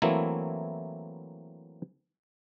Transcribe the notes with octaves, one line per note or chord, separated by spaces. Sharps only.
E3 F#3 A3 A#3 C4 E4